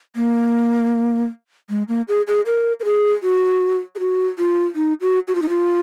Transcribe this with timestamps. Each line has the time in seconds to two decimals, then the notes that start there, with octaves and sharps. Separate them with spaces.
0.16 A#3
1.70 G#3
1.88 A#3
2.08 G#4
2.28 G#4
2.46 A#4
2.80 A#4
2.85 G#4
3.23 F#4
3.95 G#4
3.99 F#4
4.38 F4
4.75 D#4
5.01 F#4
5.28 F#4
5.35 F4
5.42 D#4
5.49 F4